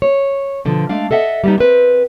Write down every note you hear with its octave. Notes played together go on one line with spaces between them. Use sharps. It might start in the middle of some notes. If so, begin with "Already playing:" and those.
C#5
B2 D3 F3
G#3 A3 D4 F5
A4 D#5 E5 F#5
G3 B3 D#4
C4 A#4 B4